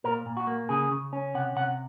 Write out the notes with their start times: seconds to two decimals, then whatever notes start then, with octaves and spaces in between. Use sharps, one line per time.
0.04 A#2 A#4
0.26 A#2
0.37 F#4
0.47 A#3
0.69 C#3 G#4
0.92 C#3
1.13 C#4
1.35 C3 F#5
1.56 C3 F#5